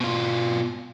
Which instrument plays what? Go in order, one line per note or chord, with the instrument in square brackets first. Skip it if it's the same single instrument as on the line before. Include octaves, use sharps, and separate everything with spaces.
[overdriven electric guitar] B2 F4